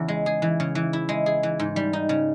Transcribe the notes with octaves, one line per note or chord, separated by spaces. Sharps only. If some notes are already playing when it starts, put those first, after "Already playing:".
Already playing: E2 C#3 E4
G#3
G#4
E3
C#3
E3
E4
G#3
G#4
E3
G#2
G3
D#4
C#3